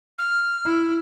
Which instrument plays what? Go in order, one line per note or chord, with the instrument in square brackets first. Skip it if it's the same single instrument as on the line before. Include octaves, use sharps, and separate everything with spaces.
[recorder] F6
[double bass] E4